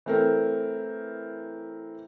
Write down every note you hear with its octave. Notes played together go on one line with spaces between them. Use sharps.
E3 A3 C4 A4 A#4